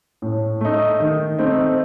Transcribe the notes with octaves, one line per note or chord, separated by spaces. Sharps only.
A2
A3 D#4
D#3
A3 C4 D#4